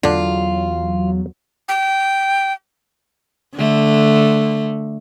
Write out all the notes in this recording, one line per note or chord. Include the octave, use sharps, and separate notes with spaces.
E2 D3 F#3 D4 F4
G5
D3 A3